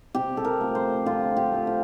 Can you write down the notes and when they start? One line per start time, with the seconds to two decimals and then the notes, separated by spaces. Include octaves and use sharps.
0.15 C3 G4
0.37 A4
0.45 A#4
0.60 F3 A3
0.75 C5
1.06 D3 F4
1.37 G4
1.52 F3 A3
1.67 F4